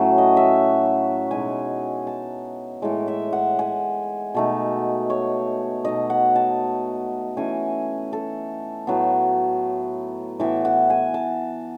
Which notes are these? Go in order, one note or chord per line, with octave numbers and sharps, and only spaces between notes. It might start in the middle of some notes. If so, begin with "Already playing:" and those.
Already playing: A2 F#3 A3 C#4 F#4
D#5
E5
B2 G#3 D#4 G#5
A5
A2 E3 G#3
E5
F#5
G#5
B2 A3 D#4
C#5
B2 A3 D#4 D#5
F#5
A5
E3 A3 C#4 G#5
A4
A2 F#3 B3
A2 E3 B3 E5
F#5
G#5
A5